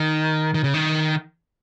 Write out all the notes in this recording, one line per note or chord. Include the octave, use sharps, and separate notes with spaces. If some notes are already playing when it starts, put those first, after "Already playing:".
Already playing: D#3
D#3
C#3
D#3